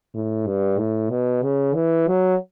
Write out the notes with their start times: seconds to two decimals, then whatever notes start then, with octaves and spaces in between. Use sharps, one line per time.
0.14 A2
0.47 G2
0.79 A2
1.10 B2
1.43 C#3
1.75 E3
2.08 F#3